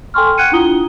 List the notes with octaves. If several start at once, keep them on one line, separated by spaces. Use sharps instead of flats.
A4 G5 G#5 C6 C#6 F6
F#5 G5 F#6 G#6 C#7 D#7
D4 E4 F4 A#5 D#6 G7